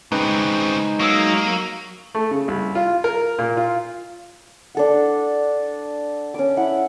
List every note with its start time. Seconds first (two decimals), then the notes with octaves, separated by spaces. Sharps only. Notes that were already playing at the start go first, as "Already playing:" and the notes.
0.12 C#3 G#3 C4 C#4 D#4 B4
1.00 F#3 A#3 C#6 D#6 E6
2.15 A3
2.31 C#3
2.48 C2
2.75 F4
3.04 A#4
3.39 A#2
3.57 F4
4.75 D4 A4 F#5
6.34 C#4 D6
6.57 E4 F#5